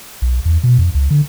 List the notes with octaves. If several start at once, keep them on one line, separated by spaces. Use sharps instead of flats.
B1
E2
B2
F2
C#2
D3